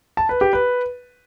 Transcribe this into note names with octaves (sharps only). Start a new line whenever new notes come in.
A5
B4
G4
B4